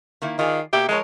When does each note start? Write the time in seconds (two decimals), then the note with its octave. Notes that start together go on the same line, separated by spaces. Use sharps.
0.22 D#3 A#3 E4
0.39 D#3 F4 G#4 D5
0.73 B2 A#3 G4 E5
0.89 F3 G#3 A#4 C#5